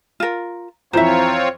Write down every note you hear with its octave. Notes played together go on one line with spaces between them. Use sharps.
F4 A#4
F2 E3 C4 F4 C5 C#5 E5 A#5